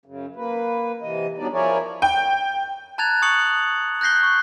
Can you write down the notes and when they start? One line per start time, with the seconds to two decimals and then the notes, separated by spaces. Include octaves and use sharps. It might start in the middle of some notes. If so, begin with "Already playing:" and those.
0.06 F#2 C#3
0.36 A#3 B4
1.02 C3 E3 D#5
1.38 F#3 G3 B3 D4 D#4 D5
1.53 F3 E4 G#4 A#4 C#5 D5
2.02 G5
2.98 A5 A#5 F#6 G#6 A6 F7
3.22 C#6 D#6 C#7 F#7
4.01 F#6 G6 A#6 C7 G7
4.23 C#6